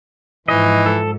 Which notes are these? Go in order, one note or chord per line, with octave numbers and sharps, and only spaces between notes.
G#2 E3 F3 D#5
A4